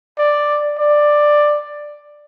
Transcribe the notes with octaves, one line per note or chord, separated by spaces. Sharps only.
D5
D5